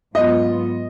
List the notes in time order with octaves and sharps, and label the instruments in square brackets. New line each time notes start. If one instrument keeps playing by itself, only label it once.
[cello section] G#2 F#3 B3 F4 [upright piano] D#5